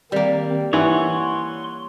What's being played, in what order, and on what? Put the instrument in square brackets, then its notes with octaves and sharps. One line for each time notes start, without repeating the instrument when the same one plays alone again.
[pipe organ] D#3 C4 [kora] G3 A#3
[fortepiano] E3 [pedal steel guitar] C#5 F#5 [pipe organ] C6